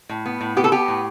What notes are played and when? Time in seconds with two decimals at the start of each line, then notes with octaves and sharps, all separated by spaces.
0.09 A2
0.26 B3
0.41 A2
0.56 B3 G4
0.64 A4
0.72 B3 G4
0.88 A2